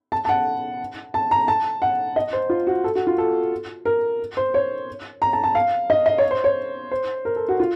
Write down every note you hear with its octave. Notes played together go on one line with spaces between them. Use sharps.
A5
A5
F#5
A5
A#5
A5
F#5
D#5
C5
F4
F#4
A4
F#4
F4
A4
A#4
C5
C#5
A#5
A5
A5
F5
D#5
D#5
C#5
C5
C#5
C5
A#4
A4
F#4
F4